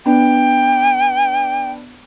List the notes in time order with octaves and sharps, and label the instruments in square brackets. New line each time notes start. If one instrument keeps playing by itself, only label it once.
[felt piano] B3 D4 [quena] G5